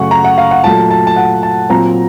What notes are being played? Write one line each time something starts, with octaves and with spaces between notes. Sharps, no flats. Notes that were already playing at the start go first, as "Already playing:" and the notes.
Already playing: F#2 C#3 A3 F#5 C#6
A#5
F#5
F5
F#5
A#2 F#3 A3 A5
A5
A5
F#5
A5
A#2 F#3 C4 A#5